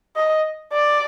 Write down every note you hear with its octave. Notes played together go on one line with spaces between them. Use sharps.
D#5
D5